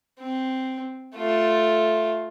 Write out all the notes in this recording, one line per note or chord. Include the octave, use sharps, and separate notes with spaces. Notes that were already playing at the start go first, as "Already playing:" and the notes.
C4
A3 F4